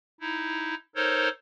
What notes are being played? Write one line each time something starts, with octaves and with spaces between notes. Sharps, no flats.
D#4 E4
D#4 A4 A#4 C5 C#5